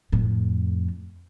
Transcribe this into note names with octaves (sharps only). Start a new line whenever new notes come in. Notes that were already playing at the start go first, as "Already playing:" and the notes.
F2 A2